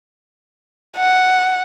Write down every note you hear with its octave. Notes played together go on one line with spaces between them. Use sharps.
F#5